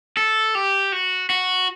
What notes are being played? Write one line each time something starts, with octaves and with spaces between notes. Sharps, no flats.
A4
G4
F#4
F#4